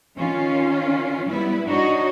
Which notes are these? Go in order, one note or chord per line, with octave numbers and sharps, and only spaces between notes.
D#3 C#4 F4
G3 B3 E4 B4
D4 D#4 F#4 C#5 D#5